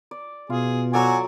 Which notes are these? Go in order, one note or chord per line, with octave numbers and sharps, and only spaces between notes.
D5
B2 F4 G#4
F#3 F#4 A4 D5 G#5